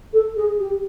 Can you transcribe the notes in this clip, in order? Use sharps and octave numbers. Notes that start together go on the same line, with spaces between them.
A4
G#4
G4